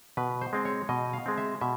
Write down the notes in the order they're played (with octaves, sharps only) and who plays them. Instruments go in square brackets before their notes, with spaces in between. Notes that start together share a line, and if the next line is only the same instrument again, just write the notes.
[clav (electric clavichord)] B2 B4
C5
G#3 C4
C#5
B2 D#5
F5
G#3 C4
E5
B2 E5